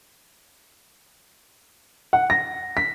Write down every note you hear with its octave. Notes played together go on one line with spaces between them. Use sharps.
F#5
A#6
B6